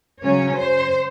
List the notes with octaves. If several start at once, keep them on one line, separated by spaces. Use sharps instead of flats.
C#3 F#3 C#4 C#5
C5